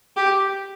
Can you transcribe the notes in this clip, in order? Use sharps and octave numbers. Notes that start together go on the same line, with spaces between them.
G4